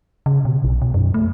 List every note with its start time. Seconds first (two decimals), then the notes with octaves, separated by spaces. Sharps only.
0.26 C#3
0.45 B2
0.64 B1
0.82 B2
0.94 F#2
1.14 A3